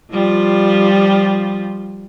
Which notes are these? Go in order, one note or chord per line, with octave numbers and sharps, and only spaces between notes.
F3 G3 F4